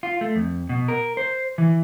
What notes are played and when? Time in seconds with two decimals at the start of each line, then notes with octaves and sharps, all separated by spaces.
0.03 F4
0.21 A3
0.35 F2
0.69 B2
0.88 A#4
1.17 C5
1.58 E3